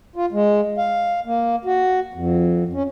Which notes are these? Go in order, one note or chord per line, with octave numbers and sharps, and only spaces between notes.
F4
G#3
F5
A#3
F#4
F2
C#4